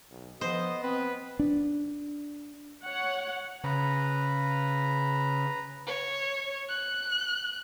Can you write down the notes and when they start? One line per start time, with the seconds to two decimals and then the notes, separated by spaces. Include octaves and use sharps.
0.10 B1
0.41 F3 B3 C5 D#5
0.83 C4 B4
1.39 D4
2.84 C#5 F#5
3.64 C#3 B4 A#5
5.86 C#5
6.69 F#6